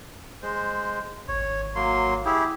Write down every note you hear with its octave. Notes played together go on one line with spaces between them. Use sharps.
G#3 C5
G#1 C#5
F#3 A#3 C6
E4 G4 G#4